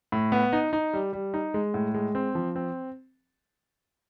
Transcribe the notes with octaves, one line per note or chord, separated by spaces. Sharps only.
A2
B3
D#4
D#4
G3
G3
D#4
G#3
A2
G#3
C4
F3
C4